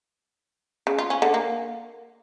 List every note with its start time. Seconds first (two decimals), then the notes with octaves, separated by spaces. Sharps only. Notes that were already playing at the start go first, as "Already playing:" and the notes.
0.87 C#3
0.99 F4
1.10 C#4
1.22 D3
1.34 A#3